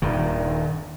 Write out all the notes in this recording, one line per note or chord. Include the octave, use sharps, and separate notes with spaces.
D#1 G2 D#3